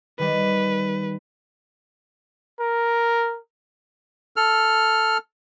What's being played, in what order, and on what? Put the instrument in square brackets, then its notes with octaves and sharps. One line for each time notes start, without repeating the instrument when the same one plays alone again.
[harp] D#3 G3 [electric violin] B4
[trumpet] A#4
[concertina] A4 F6